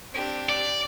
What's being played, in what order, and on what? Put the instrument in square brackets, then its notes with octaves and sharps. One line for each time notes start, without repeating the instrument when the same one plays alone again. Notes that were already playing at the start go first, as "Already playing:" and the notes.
[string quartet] C4 D4 G4
[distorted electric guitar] D5